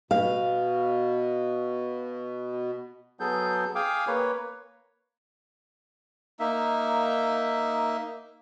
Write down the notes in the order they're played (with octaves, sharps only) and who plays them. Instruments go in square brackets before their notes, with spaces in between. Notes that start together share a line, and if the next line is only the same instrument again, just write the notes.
[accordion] B2 [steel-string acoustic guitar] F5
[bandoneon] F#3 B3 G#4 A4 G6
G#4 F5 G5 G#5 D6
A#3 B4 C#5
[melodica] A#3 D#4 E5